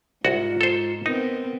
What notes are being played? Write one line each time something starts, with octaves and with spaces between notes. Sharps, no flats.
C2 G#2 F4 F#4
A4 C5
B3 C4 D#4 A#4